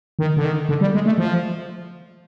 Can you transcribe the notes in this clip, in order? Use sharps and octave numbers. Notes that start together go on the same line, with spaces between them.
D#3
D3
D#3
D3
G3
G#3
A3
F3